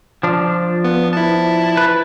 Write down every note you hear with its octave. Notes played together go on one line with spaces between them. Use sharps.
F3 D4
B3
E4 A5
B4